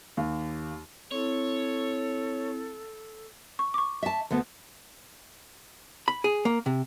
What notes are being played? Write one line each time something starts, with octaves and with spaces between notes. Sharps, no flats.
D#2
C4 E4 A4 C#5
C#6
C#6 D6
E5 A5
D2 A3 B3
B5
G#4
A#3
C3